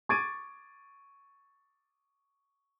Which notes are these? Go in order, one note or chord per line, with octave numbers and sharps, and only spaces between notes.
C#6 D6 G#6 A6 D7 D#7